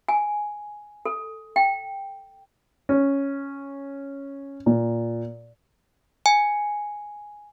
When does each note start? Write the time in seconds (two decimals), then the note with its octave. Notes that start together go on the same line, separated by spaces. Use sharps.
0.09 G#5
1.06 A4
1.56 G5
2.89 C#4
4.66 A#2
6.26 G#5